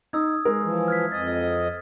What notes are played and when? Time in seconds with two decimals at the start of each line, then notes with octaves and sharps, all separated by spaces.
0.13 D#4 D#6 E6 G#6
0.45 G#3 G#4 A#4
0.62 E3 F3
0.88 F6 G#6 B6
1.12 F2 D#5 A6